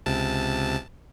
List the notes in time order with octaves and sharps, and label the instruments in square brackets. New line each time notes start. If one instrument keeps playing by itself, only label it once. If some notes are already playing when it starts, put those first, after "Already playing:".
[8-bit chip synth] C#2 C3 A5